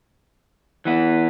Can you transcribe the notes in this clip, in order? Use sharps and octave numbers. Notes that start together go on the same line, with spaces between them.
E3 B3 E4